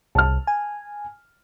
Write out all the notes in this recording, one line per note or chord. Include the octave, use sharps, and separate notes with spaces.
C2 A5 F6
G#5